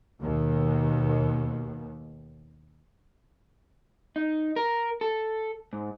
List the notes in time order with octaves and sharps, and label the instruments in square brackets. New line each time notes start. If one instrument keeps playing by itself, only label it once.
[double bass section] D#2 B2
[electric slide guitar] D#4
A#4
A4
G#2